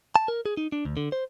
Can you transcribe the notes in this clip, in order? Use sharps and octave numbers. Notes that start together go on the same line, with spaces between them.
A5
A#4
G#4
D#4
D4
D2
D3
C5